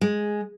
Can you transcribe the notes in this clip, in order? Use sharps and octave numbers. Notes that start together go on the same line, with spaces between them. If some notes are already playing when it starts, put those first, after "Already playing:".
G#3